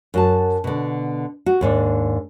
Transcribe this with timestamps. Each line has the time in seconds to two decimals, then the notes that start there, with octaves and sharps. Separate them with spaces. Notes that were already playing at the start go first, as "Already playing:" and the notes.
0.14 F#2 F#4 A5
0.64 B2 D3
1.46 F#4
1.61 D#2 G#2 D4